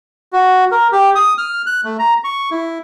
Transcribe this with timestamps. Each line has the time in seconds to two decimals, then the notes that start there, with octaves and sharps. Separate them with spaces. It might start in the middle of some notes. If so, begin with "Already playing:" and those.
0.33 F#4
0.72 A#4
0.92 G4
1.15 D#6
1.38 F6
1.67 F#6
1.84 A3
1.99 A#5
2.24 C#6
2.51 E4